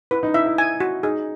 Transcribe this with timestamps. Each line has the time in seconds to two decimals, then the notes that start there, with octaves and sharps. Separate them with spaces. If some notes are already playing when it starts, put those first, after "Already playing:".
0.11 E4 B4
0.23 D#4
0.34 E4 E5
0.46 E4
0.58 G#5
0.80 F#4
1.03 D#4 G#4